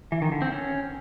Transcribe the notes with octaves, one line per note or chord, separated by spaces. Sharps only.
E3
D#3
D3
C4
C#4